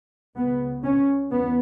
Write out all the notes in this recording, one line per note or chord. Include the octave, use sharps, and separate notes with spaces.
C#2 C#3 B3
C#4
E2 B3